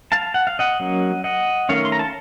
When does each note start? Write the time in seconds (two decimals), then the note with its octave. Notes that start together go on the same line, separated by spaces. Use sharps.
0.12 F5 A5
0.34 F#5
0.47 F5
0.59 D#5 F#5
0.80 F#3 A#3 C#4
1.24 D#5 F#5
1.69 D#3 A3 C#4 C#5 F5
1.85 C6
1.92 A#5
1.99 A5